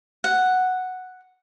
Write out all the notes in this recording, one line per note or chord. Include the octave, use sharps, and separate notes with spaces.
F#5